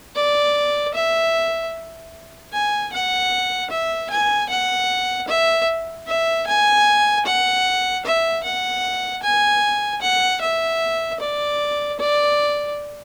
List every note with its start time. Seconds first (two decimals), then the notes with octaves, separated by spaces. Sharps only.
0.16 D5
0.94 E5
2.53 G#5
2.92 F#5
3.70 E5
4.10 G#5
4.49 F#5
5.28 E5
6.07 E5
6.47 G#5
7.26 F#5
8.05 E5
8.43 F#5
9.23 G#5
10.01 F#5
10.41 E5
11.20 D5
11.99 D5